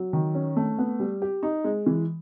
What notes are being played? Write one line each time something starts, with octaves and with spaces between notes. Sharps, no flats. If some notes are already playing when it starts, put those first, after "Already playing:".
Already playing: F#3
D#3
C#4
A3
B3
G3
G4
D#4
G#3
E3